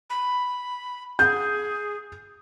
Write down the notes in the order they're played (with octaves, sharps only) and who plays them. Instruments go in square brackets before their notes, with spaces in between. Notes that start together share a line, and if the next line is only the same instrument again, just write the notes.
[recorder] B5
[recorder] G#4 [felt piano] G6